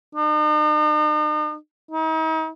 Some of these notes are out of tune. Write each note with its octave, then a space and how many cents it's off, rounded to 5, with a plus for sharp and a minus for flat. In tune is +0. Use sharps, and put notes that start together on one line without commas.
D#4 -45
D#4 +40